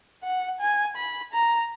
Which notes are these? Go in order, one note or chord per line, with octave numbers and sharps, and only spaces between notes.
F#5
G#5
B5
A#5